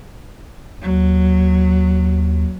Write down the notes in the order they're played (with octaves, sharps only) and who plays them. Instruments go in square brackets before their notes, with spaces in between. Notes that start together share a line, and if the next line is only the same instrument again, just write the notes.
[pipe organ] D#2 [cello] F#3